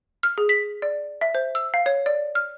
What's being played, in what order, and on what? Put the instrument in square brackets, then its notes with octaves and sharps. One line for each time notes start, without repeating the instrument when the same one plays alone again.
[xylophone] F6
G#4
B6
D5
E5
C5
E6
F5
C#5
D5
F6